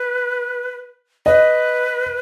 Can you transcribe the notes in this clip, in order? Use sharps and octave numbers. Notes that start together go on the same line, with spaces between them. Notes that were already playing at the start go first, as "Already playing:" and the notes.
Already playing: B4
B4 D#5